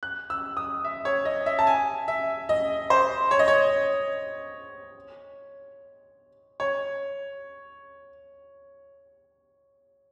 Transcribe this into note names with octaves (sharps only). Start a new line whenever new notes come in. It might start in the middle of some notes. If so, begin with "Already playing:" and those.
F#6
E6
D#6
E5
C#5
D#5
E5
A5
G#5
E5
D#5
C5
C#5
D#5
C#5
C#5